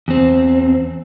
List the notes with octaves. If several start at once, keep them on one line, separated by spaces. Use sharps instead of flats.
E2 C4